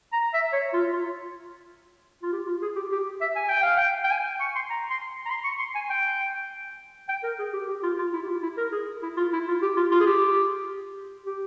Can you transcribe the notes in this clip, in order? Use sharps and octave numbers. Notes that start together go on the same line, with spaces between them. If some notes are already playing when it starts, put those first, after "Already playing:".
A#5
E5
C#5
F4
F4
F4
G4
F4
G#4
G4
G4
E5
G#5
G5
F5
G5
G5
G#5
C#6
C6
A#5
C6
A#5
C6
C#6
C6
G#5
G5
G5
A#4
G#4
G4
G4
F4
F4
E4
G4
F4
E4
A#4
G#4
E4
F4
E4
F4
G4
F4
F4
G#4
G4
G4